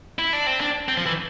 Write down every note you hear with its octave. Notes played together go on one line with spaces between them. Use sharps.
E4
D4
C4
D4
C4
F3
E3